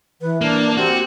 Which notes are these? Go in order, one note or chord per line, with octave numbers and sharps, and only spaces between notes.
E3 B4
A#3 D4
C4 F#4 G4